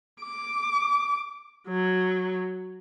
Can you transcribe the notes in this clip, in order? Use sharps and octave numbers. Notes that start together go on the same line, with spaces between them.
D6
F#3